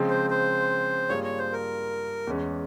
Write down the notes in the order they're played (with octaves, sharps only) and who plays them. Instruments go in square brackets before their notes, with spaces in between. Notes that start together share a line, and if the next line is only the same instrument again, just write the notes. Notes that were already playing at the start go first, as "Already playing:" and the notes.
Already playing: [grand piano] C#3 F3 G#3 C4
[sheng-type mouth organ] C5
C5
[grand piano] G2 G3 A#3 F4 G#4 [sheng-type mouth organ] C#5
[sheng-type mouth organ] C#5
C5
A#4
[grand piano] E2 E3 G#3 C#4